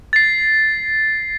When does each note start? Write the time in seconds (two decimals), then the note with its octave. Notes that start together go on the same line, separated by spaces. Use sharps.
0.13 A6 C7